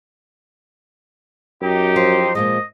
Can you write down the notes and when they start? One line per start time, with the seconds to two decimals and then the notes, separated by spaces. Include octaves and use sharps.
1.61 F#2 D#4 G4
1.96 F3 C6
2.35 A#2 F3 G#3 D#5